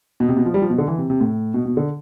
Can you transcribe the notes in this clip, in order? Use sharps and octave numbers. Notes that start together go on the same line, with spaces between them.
B2
C3
B2
F3
G3
F3
B2
D3
E3
C3
C3
A2
B2
B2
D3